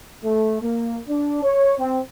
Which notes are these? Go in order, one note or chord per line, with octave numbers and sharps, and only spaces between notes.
A3
A#3
D4
C#5
C4